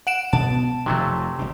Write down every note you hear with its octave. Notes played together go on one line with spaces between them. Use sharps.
F#5 D7 E7
B2 B3 A5
F1 F2 C3 D#3 F#3 A3
G1 B2